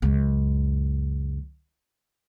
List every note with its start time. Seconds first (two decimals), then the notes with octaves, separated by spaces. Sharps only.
0.02 C#2 F#2